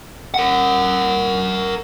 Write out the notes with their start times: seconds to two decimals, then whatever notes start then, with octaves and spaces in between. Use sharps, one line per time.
0.34 A#4 F#5